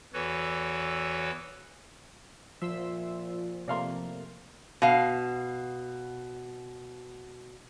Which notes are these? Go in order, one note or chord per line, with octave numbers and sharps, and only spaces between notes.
E2 E3 F#4 A4 B4 C#5
A#2 F3 E5 C6 E6
C3 A3 A#3 D5 F5 C6
B2 F5